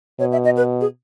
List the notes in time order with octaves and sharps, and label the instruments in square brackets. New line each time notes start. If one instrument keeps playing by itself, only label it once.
[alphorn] B2 [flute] C#5
[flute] E5
D#5
B4
G#4